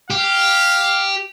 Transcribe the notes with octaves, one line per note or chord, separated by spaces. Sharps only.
G4 F5